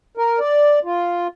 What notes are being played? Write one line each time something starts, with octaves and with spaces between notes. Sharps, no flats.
A#4
D5
F4